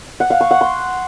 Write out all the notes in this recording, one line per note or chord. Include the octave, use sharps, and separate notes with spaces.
F#5
F5
C#6
F#5
C6